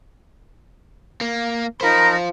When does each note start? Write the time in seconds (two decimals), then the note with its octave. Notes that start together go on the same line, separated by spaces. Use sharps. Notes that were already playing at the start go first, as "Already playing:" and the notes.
1.21 A#3
1.81 D#4 F4 A#4 C5 B5